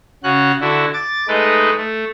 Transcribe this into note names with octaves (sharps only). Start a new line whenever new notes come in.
C#3 C#4 F#4 F#6
D3 E4 F#4
D6 A6
G#3 A3 D#4 B4
A3